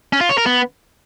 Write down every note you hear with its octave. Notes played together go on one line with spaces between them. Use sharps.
C#4
F4
C#5
A#4
B3